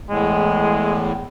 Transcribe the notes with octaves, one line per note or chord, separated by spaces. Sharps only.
E2 A2 G#3